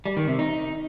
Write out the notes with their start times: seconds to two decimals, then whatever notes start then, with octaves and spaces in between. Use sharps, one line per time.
0.05 G3
0.17 D#3
0.28 C3
0.39 D#4